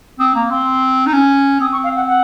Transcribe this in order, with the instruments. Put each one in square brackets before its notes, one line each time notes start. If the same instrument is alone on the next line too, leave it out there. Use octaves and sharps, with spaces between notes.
[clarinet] C4 [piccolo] D#6
[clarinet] A#3 [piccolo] A#5
[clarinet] C4 [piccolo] C6
[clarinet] D#4
C#4
[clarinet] C4 [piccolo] D#6
[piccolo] C#6
F5
F#5
F#5